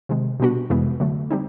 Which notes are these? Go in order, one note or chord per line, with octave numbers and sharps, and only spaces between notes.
C3 D#3 G#3
B2 G3 B3 D4 F#4
F2 C3 E3 G#3 B3
D3 F#3 A3
G3 C4 D#4